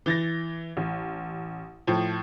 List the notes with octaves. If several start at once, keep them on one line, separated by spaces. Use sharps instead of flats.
E3 A6 A#6
A1
A2 F3